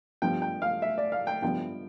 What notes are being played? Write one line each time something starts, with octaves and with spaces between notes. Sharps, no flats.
G2 F3 B3 G5
G5
F5
E5
D5
F5
G5
G2 F3 B3 G5